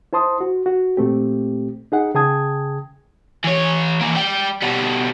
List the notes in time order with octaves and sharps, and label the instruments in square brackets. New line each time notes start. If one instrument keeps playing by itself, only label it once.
[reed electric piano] E4 C5 A5 C6 D#6
F#4
F#4
A#2 A3 C4 G4
D#4 G#4 F#5
C#3 G#4 G5 A5 D#6 G#6
[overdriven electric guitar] E3 C#5
E3 A#3
G3 G5
B2 G3